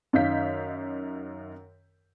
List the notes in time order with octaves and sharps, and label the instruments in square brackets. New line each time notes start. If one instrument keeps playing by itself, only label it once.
[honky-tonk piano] F#2 D#3 D#5 F5 G6 B6